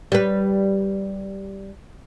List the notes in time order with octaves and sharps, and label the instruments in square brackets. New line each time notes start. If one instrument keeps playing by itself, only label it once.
[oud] G3 B4